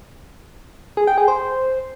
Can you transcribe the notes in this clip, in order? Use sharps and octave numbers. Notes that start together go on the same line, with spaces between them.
G#4
G5
G#4
C5